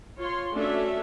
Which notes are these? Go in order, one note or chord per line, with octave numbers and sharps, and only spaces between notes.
F4 C#5 C6
A3 C#4 D4 F#4 A4 E5